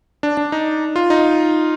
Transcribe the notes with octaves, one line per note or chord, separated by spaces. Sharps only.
D4
D4
D#4
F4
D#4